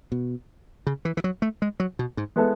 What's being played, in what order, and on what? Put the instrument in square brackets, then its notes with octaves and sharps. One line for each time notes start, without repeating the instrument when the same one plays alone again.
[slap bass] B2
C#3
E3
E3
F#3
A3
G#3
F#3
B2
G#2
[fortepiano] G#3 B3 E4 A4